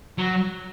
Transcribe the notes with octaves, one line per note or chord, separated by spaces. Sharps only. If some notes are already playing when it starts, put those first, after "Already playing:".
F#3